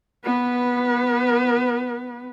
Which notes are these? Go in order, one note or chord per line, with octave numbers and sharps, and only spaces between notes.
B3 B4